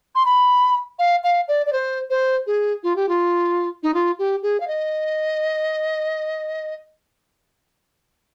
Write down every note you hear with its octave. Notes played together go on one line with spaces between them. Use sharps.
C6
B5
F5
F5
D5
D5
C5
C5
G#4
F4
G4
F4
D#4
F4
G4
G#4
F5
D#5